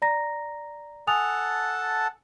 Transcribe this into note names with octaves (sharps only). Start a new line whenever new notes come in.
D5 A#5 A#6
A4 F#5 G#5 A5 D#6 F7